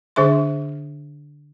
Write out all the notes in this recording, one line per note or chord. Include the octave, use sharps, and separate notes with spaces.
D3 D4 G#4 E5 C6